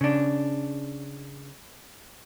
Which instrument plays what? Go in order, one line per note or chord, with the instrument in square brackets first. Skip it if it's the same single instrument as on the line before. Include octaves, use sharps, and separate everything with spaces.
[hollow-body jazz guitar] C#3 D4